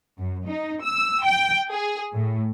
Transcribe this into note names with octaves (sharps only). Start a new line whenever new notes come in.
F#2
D#4
E6
G5
G#4
A2